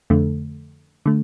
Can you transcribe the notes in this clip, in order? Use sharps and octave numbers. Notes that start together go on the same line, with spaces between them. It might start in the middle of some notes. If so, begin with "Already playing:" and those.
F2 D3 A3
D3 A3